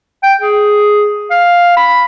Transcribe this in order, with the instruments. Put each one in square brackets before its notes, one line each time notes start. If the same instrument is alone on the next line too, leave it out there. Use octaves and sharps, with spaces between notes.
[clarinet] G5
G#4
F5
B5